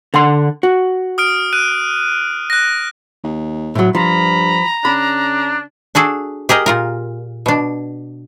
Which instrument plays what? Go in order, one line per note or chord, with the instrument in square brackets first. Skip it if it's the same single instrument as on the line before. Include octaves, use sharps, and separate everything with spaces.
[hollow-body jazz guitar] D3 F#5 C6
F#4
[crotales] D#6 F6 D7
F#6 D#7
F#6 A#6
[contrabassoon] D#2
[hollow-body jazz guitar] A2 F#3
[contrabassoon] G2 [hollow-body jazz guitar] F3 [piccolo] A#5 [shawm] B5
[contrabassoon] C#3 [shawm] D4 [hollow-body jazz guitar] B5
[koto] D4 F#4 G#4 A4
G4 G#4 A#4 D#5
A#2 F4 A#4
B2 D4